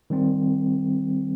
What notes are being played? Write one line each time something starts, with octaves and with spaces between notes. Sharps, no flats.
D#3 G3 C4